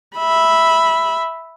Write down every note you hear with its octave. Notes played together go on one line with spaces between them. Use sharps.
E5 B5